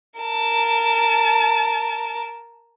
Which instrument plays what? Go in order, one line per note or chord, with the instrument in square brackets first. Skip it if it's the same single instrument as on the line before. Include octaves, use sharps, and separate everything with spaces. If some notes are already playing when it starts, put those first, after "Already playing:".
[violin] A#4 A5